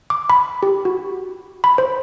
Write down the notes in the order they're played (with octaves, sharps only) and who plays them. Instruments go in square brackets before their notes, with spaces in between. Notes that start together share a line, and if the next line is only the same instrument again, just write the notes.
[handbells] D6
B5
G4
F#4
B5
C5